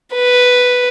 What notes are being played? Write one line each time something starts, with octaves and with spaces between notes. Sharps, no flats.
B4